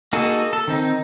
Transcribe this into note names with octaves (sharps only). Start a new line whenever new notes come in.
A#3 D#4 F#4 G#4 A4
A4
D#3 C4 D#4